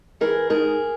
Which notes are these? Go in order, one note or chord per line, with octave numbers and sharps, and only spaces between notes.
E3 G#4 A#4
G#2 G#4 A#4